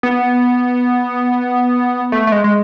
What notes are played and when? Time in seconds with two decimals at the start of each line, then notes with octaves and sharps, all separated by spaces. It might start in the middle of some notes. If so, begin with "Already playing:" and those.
0.03 B3
2.12 A3
2.27 A3
2.32 G#3
2.44 G#3